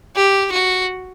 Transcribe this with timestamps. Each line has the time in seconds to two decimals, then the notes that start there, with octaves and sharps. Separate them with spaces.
0.16 G4
0.51 F#4